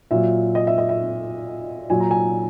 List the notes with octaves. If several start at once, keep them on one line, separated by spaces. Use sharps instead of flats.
A#2 F#3 E5
D#5
E5
D#5
E5
A#2 F#3 G#5
A#5
G#5